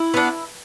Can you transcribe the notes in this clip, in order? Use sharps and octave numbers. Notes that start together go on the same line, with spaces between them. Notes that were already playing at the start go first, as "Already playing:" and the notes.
Already playing: E4
B3 D4